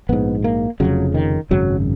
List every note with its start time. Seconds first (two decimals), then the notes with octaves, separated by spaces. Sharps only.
0.09 A#1 G#2 B3
0.44 A#3
0.80 F1 F2 C#3 F#3
1.14 D#3
1.51 G#1 F#2 C#3 F#3